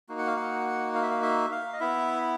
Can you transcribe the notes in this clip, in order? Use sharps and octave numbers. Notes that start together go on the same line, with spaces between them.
A#3 D#4 F#4
F#5
F5
F#5
F5
E5
F5
E5
F5
D#5
B3 E4 E5